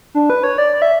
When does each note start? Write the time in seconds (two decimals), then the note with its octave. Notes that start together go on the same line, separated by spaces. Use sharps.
0.15 D4
0.30 B4
0.44 C#5
0.58 D5
0.73 D5
0.82 E5